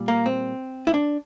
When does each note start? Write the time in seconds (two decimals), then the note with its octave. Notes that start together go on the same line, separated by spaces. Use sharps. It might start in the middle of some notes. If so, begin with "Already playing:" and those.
Already playing: A#2 G3
0.08 A#3
0.26 C4
0.87 E4
0.94 D4